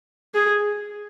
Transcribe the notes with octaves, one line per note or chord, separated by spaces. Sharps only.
G#4